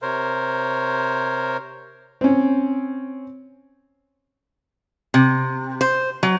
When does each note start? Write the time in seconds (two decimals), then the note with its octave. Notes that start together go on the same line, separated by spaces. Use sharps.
0.02 C3 A#4 C5 C#5
2.21 C4 C#4
5.14 C3
5.81 C5
6.23 F#3